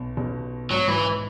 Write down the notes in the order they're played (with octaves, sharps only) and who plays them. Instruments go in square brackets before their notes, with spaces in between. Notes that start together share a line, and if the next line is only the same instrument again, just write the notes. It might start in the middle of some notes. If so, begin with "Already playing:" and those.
Already playing: [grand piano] B1 B2
B1 B2
[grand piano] G#2 [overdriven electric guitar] F#3
[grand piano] G#2 [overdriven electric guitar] E3